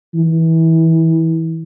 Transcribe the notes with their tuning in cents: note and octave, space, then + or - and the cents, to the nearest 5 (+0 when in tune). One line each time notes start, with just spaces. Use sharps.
E3 -25